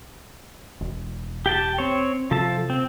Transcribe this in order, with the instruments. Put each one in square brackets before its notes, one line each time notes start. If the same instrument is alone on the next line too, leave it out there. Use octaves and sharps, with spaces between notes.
[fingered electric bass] E1
[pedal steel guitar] G4 G5 A5
C4 C#5
[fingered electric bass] C3 [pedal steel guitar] F3 A4 A5
[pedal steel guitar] C4